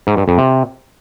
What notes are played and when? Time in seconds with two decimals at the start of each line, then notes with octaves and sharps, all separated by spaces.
0.07 G#2
0.17 G2
0.28 F2
0.38 C3